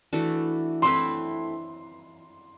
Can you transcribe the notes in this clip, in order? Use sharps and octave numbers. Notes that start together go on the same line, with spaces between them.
E3 A3 D4 F#4
A3 C4 E4 B4 C6